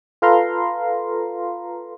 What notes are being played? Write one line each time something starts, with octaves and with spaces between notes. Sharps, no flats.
F4 A4 B4 F5 A#5 C6